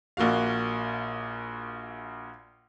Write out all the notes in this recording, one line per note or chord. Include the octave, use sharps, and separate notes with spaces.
A#1 A#3 F#4 F5